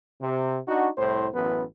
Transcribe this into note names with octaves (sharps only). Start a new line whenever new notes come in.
C3
D4 D#4 F#4
C2 A2 C5
A1 F#2 E3 B3 B4